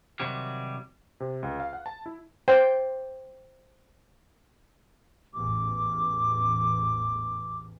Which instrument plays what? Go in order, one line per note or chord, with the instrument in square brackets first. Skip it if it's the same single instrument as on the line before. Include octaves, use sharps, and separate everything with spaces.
[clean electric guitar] C3 D#3 F#3 G3
[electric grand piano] C3
C#2
F5
F#5
A5
E4
[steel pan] C5 G5
[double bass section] A1 E2 G#2 [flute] D6